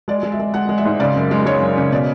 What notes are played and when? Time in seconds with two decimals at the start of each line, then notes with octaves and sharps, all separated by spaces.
0.08 G#3 D5
0.23 G#3
0.32 E5
0.39 G#3
0.54 G#3 F#5
0.69 G#3
0.78 E5
0.85 G#2
1.00 C#3 D5
1.16 F#2
1.31 G#3
1.45 G#3 C#5
1.61 F#2
1.77 C#3
1.91 B2 D5